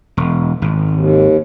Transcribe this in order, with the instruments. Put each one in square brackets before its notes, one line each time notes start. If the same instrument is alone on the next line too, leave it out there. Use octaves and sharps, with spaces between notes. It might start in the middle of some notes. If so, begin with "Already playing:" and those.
[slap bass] E1
G#1
[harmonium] D#2